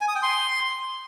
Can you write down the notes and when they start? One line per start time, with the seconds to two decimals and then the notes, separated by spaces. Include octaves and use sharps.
0.01 G#5
0.08 D#6
0.15 G5
0.23 C6